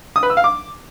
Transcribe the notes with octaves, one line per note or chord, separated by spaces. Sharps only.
D#6
B4
E6
F5
D6